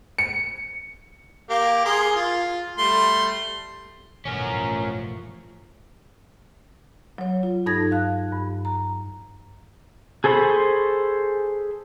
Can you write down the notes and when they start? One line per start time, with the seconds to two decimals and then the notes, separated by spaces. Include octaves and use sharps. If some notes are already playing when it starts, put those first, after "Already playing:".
0.18 C#7
1.49 A#3 G4 F5
1.85 G#4 A#4 C6
2.16 F4
2.78 G3 A3 C6
4.25 A1 G2 B2 E3 F3 A3 C#4 A#4
7.18 F#3 C#5
7.43 F4
7.66 G2 D#4 A4 A5 G#6 A#6
7.91 F5 F#6
8.32 G2
8.65 A#5
10.24 G#4 A4 C5 B5 C#6